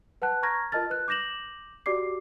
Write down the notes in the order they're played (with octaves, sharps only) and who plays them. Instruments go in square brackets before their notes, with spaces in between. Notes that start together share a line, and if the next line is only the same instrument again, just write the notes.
[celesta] B4 F#5 A5 F#6
A#5 C#6 F6 G#6 A#6
F4 A#4 D#5 A5 F6 A6
B4 F#6
D6 G6 A#6 E7 F#7
F#4 G4 D5 D6 C7